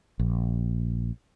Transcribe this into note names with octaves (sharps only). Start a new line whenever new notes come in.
A#1